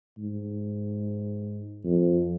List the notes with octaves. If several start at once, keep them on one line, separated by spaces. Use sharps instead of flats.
G#2
F2